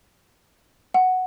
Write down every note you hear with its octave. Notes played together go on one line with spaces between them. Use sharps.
F#5